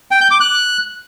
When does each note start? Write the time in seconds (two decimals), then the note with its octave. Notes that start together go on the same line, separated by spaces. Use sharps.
0.11 G5
0.21 G6
0.31 D6
0.41 F#6